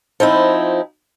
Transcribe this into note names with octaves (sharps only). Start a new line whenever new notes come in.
F3 C4 D#4 E4